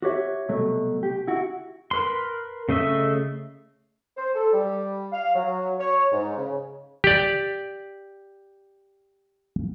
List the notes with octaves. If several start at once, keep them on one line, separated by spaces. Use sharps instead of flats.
F#4 G4 C#5 E5
C2 B2 F#3 A3
G4
E4 F#4
A#4 B4 C6
C#3 A3 D#5 E5
C5
A4
G3
F5
F#3
C#5
G#2
C#3
G4 D5